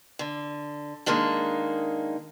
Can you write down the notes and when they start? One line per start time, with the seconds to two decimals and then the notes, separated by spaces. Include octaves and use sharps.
0.19 D3
1.06 D#3 G#3 A#3 D4 D#4